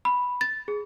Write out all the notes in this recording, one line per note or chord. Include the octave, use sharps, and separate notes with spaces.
B5
A6
G#4